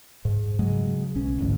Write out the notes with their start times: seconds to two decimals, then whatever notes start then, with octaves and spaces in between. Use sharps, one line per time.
0.25 G#2
0.59 C#3 F#3 G#3
1.15 B1 C#4
1.39 A1 D2 G#2